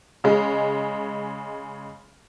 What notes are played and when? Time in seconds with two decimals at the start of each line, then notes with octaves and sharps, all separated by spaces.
0.24 C#3 G#3